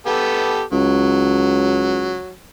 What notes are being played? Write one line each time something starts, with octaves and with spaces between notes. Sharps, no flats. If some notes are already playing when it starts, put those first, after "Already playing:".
B3 G4 A4
C#2 F#3